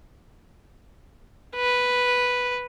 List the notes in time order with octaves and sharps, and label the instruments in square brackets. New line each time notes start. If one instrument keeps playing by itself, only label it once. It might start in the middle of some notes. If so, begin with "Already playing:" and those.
[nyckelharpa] B4